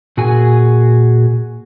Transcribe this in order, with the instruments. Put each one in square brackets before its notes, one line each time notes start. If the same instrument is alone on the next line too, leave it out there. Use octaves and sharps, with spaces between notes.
[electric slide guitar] A#2 F#4 G#4 G#5